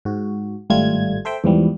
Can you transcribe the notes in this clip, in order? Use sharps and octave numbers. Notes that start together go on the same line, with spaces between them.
G#2 F#4
G#1 A2 G3 A3 F4 G#6
A4 C5 E5 G5
E2 G#2 E3 F3 G3